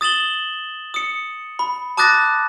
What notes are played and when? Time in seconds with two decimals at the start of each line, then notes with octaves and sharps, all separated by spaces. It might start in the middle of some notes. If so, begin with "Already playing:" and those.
0.01 D#6 A6 E7 F#7 G7
0.94 D#6 C#7
1.59 B5
1.97 A5 D6 D#6 F#6 A6 A#6